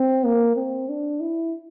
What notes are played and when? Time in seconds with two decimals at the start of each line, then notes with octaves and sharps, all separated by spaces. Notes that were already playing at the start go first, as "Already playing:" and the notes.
Already playing: C4
0.25 A#3
0.56 C4
0.89 D4
1.21 E4